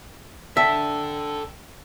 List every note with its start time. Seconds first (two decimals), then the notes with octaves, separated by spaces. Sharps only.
0.57 A4 D5 E5 G5 A5 E6